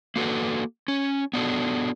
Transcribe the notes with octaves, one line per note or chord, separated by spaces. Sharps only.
A#3 F#4 A4 B4
C#4
B3 D4 F#4 A4